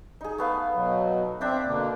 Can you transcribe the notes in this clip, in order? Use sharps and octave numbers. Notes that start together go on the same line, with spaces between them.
D#4 G#4
A3 B3 F5
B2 F#3
C4 D4 E5 G5
B2 D3 A#3